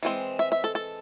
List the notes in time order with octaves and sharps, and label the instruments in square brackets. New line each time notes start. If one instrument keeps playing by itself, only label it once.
[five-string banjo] E3 G#3 C4
E5
E5
A4
A4